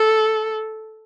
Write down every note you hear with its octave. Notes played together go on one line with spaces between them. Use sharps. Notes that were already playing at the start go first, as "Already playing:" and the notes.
Already playing: A4